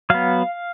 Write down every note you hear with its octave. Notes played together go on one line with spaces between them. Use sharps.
F#3 B3 F5